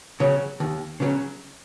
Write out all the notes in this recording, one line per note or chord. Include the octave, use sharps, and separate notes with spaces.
C#3 F#3 C#4
D#2
C#3 F#3 C#4